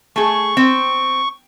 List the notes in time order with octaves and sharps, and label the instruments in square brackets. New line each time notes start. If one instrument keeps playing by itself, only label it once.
[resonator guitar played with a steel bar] A3 G#4 [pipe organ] C#6
[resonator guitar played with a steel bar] C4